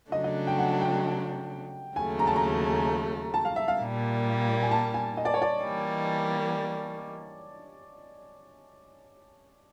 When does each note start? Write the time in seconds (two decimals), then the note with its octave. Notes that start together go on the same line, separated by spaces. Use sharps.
0.12 C#3 F#3 A3 D4 D#5
0.24 D#5
0.47 G5
0.59 F#5
0.81 G5
1.96 D#2 C#3 F#3 A3 G#5
2.19 A#5
2.27 A5
2.36 A#5
3.34 A5
3.45 F5
3.56 E5
3.68 F5
3.80 A#2 G3 A#3
4.63 G#5
4.71 A5
4.94 G#5
5.17 D#5
5.25 D5
5.34 C#5
5.42 D5
5.63 E3 G3 A#3